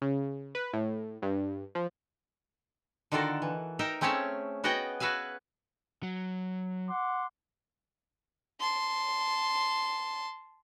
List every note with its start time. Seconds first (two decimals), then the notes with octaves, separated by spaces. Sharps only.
0.02 C#3
0.55 B4
0.73 A2
1.22 G2
1.75 F3
3.12 D3 D#3 F4 F#4 A4 A#4
3.42 E3
3.79 D#4 A#4 D#5 E5 G5
4.01 A3 C4 C#4 G#4 C#5 E5
4.64 B3 F#4 G#4 D#5 F#5 G5
5.00 F#4 B4 E5 F5 G#5
6.03 F#3
6.89 F#5 C6 D6
8.60 A5 C6